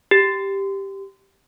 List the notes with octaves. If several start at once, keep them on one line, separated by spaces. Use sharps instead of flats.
G4